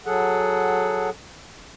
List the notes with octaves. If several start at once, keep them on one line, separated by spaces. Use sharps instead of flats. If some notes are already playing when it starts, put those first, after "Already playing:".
F#3 G#4 A4 F#5